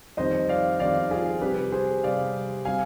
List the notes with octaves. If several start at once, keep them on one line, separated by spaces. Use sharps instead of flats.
F2 D#3 G3 C4 C5 D#5
D5 F5
F2 D#3 G3 C4 D5 F5
F4 G#4
C3 G3 C4 G4 B4
G#4 C5
C3 G3 C4 D5 F5
G3 C4 F5 G#5